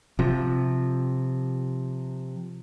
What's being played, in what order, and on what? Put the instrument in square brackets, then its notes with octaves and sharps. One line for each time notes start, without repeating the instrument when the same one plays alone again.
[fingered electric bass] C3 F3